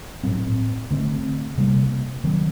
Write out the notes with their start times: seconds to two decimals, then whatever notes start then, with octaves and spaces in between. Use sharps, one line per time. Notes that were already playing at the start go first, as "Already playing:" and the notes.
0.23 A2 F#3 C4
0.91 D3 A3 C4
1.58 C3 G3 A#3
2.24 D#3 F#3 C4